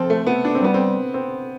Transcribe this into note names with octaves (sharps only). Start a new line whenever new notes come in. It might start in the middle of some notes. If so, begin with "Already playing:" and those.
Already playing: F3 C4 A4
A3
B3
D4
C4
G3 B3
C4
C4